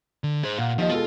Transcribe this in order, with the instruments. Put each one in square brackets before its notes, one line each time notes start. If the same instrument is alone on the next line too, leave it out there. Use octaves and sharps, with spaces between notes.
[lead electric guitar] D3
G#4 C5
[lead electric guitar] A#2 [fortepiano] F5 F#5
[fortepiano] D#2 D#5 [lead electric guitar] F3
[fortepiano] B2 G#3 A4 [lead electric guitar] F4